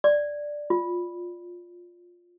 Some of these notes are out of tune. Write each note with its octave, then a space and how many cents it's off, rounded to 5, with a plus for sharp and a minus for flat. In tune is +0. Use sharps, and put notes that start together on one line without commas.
D5 +0
F4 +10